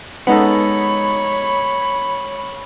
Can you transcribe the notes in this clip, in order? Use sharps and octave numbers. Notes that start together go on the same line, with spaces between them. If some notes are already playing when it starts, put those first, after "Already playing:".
G#3 B3 D#4 A4 C#5 F#5 B5